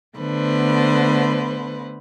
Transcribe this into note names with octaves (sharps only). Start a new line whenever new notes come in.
D3 A3 B3 B4 C5